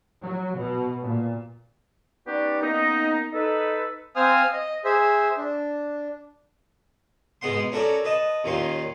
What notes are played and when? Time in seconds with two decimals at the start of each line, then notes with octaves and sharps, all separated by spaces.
0.21 F#3
0.55 B2
1.02 A#2
2.27 B3 C#4 D#4 F#4 G4 D5
2.61 A#3 B3 C#4 D#4
3.33 D#4 A4 B4
4.16 C4 C5 F5 G#5 D#6 F6
4.53 D#5
4.85 G#4 C5 E5
5.38 D4
7.41 G#2 B2 G#3 B3 F#5 C6
7.72 C#4 F#4 A4 A#4 C#5 D5
8.05 B4 D#5 A5
8.44 D#2 A#2 D#3 C#4 C6